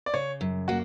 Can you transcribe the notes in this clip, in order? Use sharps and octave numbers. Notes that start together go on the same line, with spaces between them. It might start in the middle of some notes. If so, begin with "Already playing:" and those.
D5
C#3 C#5
F#2
A#3 F#4